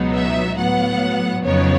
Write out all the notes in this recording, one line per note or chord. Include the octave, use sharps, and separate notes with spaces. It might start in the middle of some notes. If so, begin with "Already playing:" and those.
Already playing: C#2 B2 F#3 B3 D#4
E5
A2 F#3 B3 F#5
F2 C#3 F#3 B3 D#4 C#5